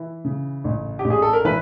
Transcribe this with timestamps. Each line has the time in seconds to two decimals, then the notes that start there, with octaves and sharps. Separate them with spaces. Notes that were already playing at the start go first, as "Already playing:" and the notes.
Already playing: E3
0.25 C#3
0.64 A1
0.99 G4
1.04 A1
1.10 G#4
1.22 A4
1.33 A#4
1.45 E3 B4